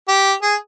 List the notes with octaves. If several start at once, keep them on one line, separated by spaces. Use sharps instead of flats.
G4
G#4